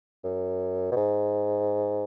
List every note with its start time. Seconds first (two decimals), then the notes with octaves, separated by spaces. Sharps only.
0.24 F#2
0.92 B2
0.96 G#2